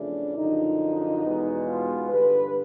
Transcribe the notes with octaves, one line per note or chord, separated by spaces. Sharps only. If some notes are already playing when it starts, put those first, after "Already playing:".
Already playing: E2 C#3 F3 A3 D4
F#2 D3 F3 D#4
E2 B2 G#3 B3
F4
G2 D3 G3 B4